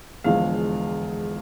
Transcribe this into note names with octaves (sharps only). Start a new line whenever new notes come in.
E1 E2 D3 F3 G#3 F5